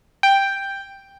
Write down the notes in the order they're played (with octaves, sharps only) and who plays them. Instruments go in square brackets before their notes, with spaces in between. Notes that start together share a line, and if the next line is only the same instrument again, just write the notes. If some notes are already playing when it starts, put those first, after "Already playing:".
[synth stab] G5